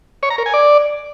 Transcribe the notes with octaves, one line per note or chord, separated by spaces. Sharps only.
C#5
A#5
A#4
G#5
D5